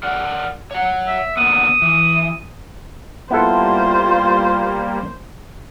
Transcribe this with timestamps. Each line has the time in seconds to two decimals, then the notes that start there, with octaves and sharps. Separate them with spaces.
0.03 A#4 D5 F#5
0.71 C#5 F#5
1.07 E5
1.37 D3 A#3 B3 D#6
1.82 E3
3.30 G3 A#3 B3 E4 F4 A4 C5